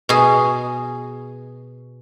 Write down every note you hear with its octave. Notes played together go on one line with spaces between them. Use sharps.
B2 G#4